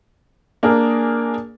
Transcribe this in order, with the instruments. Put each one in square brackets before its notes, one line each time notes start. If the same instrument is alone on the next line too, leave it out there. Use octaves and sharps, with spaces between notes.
[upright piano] A#3 D4 G#4 A#4